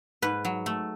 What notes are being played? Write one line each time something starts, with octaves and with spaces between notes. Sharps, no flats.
G#2 B4
F#3
A3